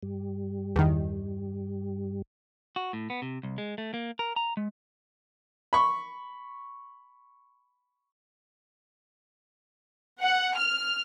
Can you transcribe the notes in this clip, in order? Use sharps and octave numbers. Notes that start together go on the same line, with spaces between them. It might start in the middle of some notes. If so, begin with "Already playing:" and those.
G2 G3
E2 D#3
F#4
A2
B3
C3
C2
G#3
A3
A#3
A#4
A#5
G#3
B5 C#6
F#5
F6